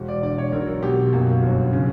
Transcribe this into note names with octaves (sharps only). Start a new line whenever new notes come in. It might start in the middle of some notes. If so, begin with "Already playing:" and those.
Already playing: E1
D5
D3 D5
C#5
B1 A#4
B2 G4
F#2 A#3
G1
C#3